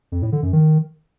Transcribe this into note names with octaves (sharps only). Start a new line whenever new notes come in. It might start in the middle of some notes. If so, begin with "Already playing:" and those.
F2
A2
D3
F#2
D#3